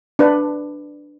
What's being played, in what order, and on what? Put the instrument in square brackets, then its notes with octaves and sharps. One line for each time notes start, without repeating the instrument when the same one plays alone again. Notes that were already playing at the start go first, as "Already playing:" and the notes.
[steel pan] D4 B4